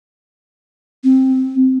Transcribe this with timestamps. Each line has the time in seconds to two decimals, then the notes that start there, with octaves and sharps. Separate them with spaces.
1.04 C4